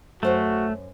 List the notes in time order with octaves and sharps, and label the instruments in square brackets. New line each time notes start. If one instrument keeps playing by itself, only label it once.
[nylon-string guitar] F#2 C5 C#5 [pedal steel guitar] A3 [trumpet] F#4